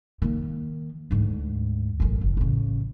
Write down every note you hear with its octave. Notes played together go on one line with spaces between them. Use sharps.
D#3 A#3
D2 G#2
A1 F#2
F#1
A1 C#3